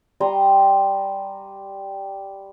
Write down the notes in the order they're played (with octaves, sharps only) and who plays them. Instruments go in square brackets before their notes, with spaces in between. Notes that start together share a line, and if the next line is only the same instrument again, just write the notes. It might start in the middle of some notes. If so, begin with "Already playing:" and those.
[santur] G3 G#5 A#5 C6